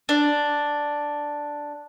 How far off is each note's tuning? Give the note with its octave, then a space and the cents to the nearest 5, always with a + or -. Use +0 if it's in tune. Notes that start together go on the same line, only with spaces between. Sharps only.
D4 +0